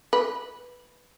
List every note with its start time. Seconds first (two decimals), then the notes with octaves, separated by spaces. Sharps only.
0.13 B4